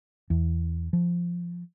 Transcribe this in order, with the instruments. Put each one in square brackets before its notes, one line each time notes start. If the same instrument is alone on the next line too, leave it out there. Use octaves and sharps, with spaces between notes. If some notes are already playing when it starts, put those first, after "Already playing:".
[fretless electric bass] E2
F3